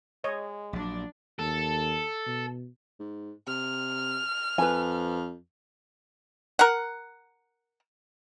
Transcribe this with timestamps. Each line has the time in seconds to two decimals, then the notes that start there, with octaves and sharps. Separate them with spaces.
0.24 G#3 C#5 D#5
0.73 A#1 F#3 D4 D5
1.39 D#2 A4
2.26 B2
2.99 G#2
3.47 C3 F6
4.58 F2 B4 G#5
6.59 A#4 F#5